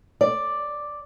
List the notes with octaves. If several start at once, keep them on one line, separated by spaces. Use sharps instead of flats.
D5